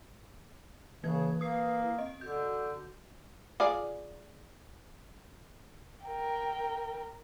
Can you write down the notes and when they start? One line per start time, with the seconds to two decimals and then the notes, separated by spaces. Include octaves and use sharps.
1.03 C#3 E3 A#3 B4 G#6
1.41 A#3 B4 D#6 C7
1.84 E4
1.99 C4 D#5
2.21 D3 F#4 G6
3.60 F4 G#4 D5
6.05 A#4 G5